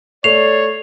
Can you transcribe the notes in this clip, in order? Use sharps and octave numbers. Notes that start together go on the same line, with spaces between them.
A3 C#5 D5 C7 F7